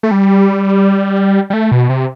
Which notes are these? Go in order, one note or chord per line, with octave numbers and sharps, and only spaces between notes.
A3
G3
G3
A3
B2
C3